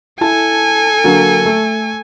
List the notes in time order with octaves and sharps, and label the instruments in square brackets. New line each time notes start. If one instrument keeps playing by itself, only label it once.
[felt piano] E4 A5 [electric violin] A4 G#5
[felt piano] D3 F#3 A#3
A3